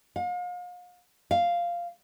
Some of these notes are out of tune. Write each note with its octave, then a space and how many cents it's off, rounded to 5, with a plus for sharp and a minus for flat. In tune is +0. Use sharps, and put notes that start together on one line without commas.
F5 +40
F5 -5